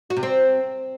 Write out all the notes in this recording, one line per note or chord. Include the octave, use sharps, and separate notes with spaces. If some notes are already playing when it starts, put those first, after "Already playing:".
F#4
C3
C4